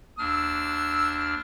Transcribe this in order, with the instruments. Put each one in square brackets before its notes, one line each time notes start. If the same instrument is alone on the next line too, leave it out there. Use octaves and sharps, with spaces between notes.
[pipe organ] D#2 D4 F6 [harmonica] E6